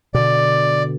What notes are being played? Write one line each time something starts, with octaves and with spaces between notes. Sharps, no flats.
B2 D3 D5